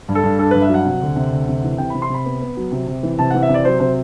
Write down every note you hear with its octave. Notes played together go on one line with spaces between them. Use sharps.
G2
A4
G2
D4 A4
G2 B4
E5
F#3 F#5
C3
D2
C3
D2
C3
E3
C3 G5
C3 B5
C6
C3 B5
B3
B3
F#3
C3
C3
E3
C3 A5
E3 F#5
E5
C3
D5
F#3 C5
C3 C5